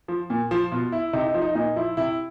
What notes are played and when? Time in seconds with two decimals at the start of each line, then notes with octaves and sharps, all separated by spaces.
0.08 F3
0.30 A#2
0.51 F3
0.71 B2 F4
0.92 E4
1.13 C3 D#4
1.27 D#4
1.34 F3
1.42 D#4
1.55 A#2 D#4
1.76 F3 E4
1.97 C3 E4